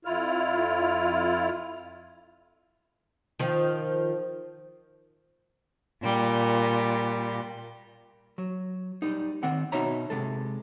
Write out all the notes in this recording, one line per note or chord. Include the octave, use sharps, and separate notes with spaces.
F2 E4 F4 F6
D#3 F3
A#2 G3
F#3
G3 D#4
D#3 C4 F#5
B2 D#4 C#5 E5 A#5
C3 G#3 A4